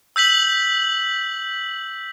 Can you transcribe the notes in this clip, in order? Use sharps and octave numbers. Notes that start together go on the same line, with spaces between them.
E6 G6 B6 F#7